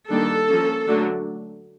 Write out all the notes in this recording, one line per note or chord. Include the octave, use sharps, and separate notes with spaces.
D#3 G3 A#3 D4 A4
F3 A#3 C#4
D3 F#3 A3 D4